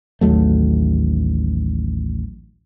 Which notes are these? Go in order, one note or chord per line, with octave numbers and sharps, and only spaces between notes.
A1 D#2 F#3 A3